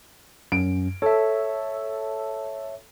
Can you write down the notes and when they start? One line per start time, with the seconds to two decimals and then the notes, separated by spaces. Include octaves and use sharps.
0.52 F#2 D7
1.02 A4 C#5 E5